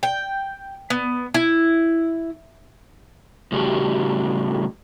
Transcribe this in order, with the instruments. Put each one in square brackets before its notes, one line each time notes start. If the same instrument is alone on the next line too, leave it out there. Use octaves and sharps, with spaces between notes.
[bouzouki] G5
B3
E4
[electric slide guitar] A2 C#3 G3 F#4 G4